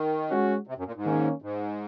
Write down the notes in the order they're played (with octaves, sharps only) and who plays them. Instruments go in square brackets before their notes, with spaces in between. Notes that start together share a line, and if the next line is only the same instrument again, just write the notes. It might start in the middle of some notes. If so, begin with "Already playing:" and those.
Already playing: [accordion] D#3
[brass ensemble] G#3 C#4 F#4
[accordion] C3
F#2
A#2
G#2
[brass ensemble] D#3 A#3 C#4
[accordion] G#2